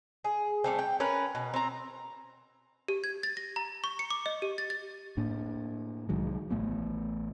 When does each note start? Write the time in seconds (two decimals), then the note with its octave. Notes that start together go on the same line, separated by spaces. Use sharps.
0.24 G#4
0.64 G3 A3 C4
0.79 G5
1.00 C#4 A#4 B4
1.35 B2
1.54 C4 A#5
2.88 G4
3.04 G#6
3.23 A6
3.37 A#6
3.56 A#5
3.84 C#6
3.99 C#7
4.11 D6
4.26 D#5
4.42 G4
4.58 A6
4.70 A6
5.17 A2 A#3 D4
6.09 C2 D#3 F#3 G#3
6.50 A1 A2 A3 B3